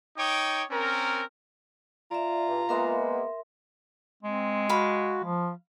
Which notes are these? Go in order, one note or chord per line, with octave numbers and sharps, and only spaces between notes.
D#4 C#5 G5 D6 D#6
C4 C#4 A#4
F4 D5 E5 A#5
G2 E3
G#3 A#3 B3 A#4 E5 C6
G#3 C4
F#4 F5 B5
F3